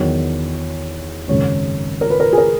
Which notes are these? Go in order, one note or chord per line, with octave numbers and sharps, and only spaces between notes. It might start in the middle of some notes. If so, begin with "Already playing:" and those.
Already playing: E2 D#3 F#3 C#5
G#1 F#2 C#3 C#5
A#4
B4
A#4
G#4
A#4